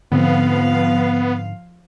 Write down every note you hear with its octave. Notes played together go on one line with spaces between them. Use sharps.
G#2 D3 F3 B3 C4 F5